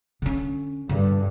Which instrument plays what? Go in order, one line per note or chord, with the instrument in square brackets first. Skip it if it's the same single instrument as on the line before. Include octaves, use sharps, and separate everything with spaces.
[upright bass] D3 C#4
[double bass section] G2 [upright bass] D3